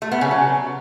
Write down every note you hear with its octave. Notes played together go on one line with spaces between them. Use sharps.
A3
B3
C#3
F#3